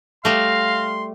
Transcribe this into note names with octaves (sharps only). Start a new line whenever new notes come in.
G3 A3 F5 C6 A#6